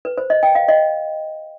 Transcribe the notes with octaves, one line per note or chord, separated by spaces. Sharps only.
B4
C5
D#5
G5
F5
D#5